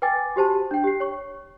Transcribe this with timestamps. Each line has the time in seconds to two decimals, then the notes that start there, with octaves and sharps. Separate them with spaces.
0.02 B4 G5 G#5 D6 A6
0.36 F#4 G4 C5 A5
0.71 D4 G5
0.84 G4 C7
1.00 C#5 C#6